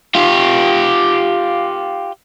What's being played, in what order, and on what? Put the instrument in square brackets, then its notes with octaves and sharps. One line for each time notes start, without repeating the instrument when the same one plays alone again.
[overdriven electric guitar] F4 G4